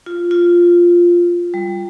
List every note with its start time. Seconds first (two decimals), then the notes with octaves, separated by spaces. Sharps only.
0.06 F4
0.31 F4
1.54 G3